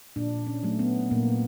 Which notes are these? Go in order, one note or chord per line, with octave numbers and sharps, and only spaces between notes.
A#2 D4
C#4
F#3 A3
B3
A#2 A#3